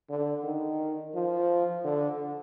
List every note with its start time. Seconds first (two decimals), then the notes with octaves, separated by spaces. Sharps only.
0.10 D3
0.44 D#3
1.15 F3
1.84 D3